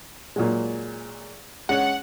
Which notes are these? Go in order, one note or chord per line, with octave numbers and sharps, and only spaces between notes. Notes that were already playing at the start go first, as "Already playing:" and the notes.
A#2 F#3 G#3
G#3 C#4 F#5